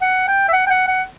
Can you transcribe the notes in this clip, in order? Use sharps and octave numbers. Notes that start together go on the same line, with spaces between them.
F#5
G5
E5
F#5
G5
F#5
F#5